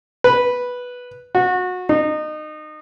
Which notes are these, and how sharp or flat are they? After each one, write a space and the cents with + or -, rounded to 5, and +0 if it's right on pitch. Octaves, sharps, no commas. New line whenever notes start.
B4 -5
F#4 -25
D#4 -25